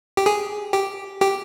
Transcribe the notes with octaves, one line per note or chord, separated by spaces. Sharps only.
G4
G#4
G4
G4